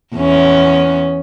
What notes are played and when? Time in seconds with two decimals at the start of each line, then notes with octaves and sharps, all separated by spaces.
0.15 E2 C#4